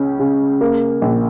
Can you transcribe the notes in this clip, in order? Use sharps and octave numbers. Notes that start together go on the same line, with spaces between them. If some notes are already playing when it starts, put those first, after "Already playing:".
Already playing: C#2 C#4
C#3
A#3
A#1